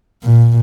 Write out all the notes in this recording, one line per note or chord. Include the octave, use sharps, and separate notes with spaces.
A#2